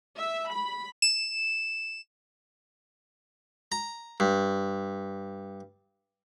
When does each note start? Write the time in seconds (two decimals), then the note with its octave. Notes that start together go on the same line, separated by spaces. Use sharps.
0.16 E5
0.48 B5
1.02 E7
3.72 A#5
4.20 G2